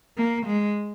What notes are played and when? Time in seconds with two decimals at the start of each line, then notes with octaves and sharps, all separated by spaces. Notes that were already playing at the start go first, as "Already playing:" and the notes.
0.17 A#3
0.46 G#3